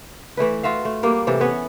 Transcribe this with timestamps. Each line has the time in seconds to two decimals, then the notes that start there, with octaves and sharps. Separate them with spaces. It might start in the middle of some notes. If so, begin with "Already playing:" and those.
0.37 E3 A3 E4 B4
0.63 F4 F#4 E5 F5
0.85 A3
1.03 G3 A#3 D4
1.27 A2 C3 E3 A4
1.40 B3 C#4 B4 C#5